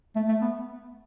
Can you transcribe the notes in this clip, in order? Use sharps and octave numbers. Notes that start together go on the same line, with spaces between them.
A3
A3
B3